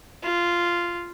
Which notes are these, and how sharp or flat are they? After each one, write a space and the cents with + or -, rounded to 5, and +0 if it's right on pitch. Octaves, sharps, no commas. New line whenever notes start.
F4 -10